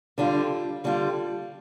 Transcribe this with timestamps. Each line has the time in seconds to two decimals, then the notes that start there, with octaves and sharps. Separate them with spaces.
0.18 D3 G3 D4 F4
0.84 D3 G3 D4 F4